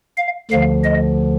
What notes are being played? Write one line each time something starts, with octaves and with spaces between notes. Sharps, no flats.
F5
D2 D3 F3 F5
D#5